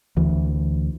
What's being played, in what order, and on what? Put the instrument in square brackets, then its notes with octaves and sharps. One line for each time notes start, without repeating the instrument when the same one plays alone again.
[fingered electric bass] D2 E3